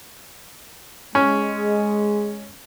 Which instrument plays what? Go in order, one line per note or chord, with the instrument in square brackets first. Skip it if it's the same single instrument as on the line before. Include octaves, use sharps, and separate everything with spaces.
[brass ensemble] G#3 [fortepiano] C#4